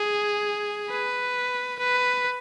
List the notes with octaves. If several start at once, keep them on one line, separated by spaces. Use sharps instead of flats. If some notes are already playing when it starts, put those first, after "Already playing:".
Already playing: G#4
B4
B4